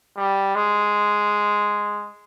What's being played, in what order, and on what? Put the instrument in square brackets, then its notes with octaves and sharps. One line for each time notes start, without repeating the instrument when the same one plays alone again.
[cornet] G3
G#3